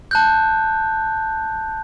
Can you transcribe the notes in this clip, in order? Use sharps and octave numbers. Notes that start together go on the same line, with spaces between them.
A5 F#6 G6